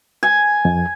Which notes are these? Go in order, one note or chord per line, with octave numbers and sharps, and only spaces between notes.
G#5
F2